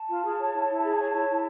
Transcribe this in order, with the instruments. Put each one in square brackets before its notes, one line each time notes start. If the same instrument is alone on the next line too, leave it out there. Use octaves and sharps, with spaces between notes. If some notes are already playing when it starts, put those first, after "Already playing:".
Already playing: [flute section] A5
F4
G#4
C#5
E4
E4
G#4
C#5
E4
E4